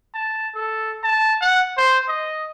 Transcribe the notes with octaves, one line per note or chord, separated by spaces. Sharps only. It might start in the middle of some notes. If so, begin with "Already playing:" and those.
A5
A4
A5
F#5
C5
D#5